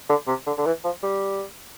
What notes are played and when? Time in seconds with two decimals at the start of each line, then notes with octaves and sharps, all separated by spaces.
0.09 D3
0.27 C3
0.46 D3
0.58 D3
0.66 E3
0.84 F3
1.03 G3